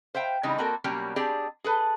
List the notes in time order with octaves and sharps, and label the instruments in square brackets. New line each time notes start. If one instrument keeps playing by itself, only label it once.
[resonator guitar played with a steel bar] C5 E5 F5 G5
C#3 E3 G3 G#3 C4 D#4
A#3 C4 F#4 A4 A#4
B2 F#3 G3 A#3 C#4 G4
C4 D4 G4 G#4 D5
G#4 A4 B4